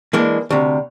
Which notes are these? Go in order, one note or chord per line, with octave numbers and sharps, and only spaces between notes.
E3 G#3 A#3 D4
D2 C3